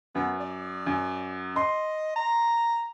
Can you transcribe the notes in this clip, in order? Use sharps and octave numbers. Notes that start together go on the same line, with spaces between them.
F#2 B3
D5
F#2
D#5 C6
A#5